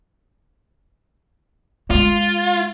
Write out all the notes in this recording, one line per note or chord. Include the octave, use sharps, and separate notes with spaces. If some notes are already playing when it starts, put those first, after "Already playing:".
G#3 A#3 F4